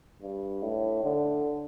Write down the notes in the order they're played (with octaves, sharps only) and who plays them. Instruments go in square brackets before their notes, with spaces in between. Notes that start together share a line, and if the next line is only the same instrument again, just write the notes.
[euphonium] G2
A2
D3